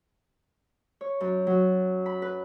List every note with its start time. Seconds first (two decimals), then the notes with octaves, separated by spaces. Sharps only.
1.01 C#5
1.21 F#2
1.47 F#3
2.06 B5
2.22 B4